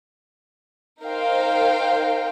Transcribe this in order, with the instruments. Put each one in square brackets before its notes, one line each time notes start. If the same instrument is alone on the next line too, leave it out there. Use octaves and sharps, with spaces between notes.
[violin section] D#4 A#4 C5 F5 G5